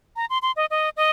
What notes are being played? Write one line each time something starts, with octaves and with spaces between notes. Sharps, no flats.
A#5
C6
C6
D#5
D#5
D#5